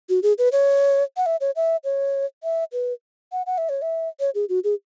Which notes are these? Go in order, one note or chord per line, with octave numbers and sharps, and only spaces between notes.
F#4
G#4
B4
C#5
F#5
E5
C#5
E5
C#5
E5
B4
F#5
F#5
E5
C#5
E5
C#5
G#4
F#4
G#4